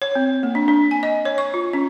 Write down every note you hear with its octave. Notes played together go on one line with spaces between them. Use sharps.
C#5
C4
A#3
D4
D4
G#5
D#5
C#5
C#6
F4
C#4